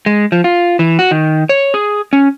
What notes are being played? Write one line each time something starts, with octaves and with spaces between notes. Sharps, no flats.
G#3
F3
F4
E3
F#4
D#3
C#5
G#4
C#4